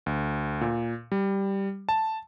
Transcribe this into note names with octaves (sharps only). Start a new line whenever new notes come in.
D2
A#2
G3
A5